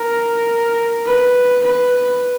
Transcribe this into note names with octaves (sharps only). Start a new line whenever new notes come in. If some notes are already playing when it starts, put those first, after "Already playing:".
Already playing: A#4
B4
B4